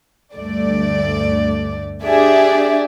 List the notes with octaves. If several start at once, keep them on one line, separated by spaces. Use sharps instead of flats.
D2 G2 A3 D5
D4 G4 G#4 D5 E5